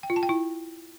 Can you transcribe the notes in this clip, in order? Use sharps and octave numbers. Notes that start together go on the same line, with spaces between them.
G5
F4
A5
G5
E4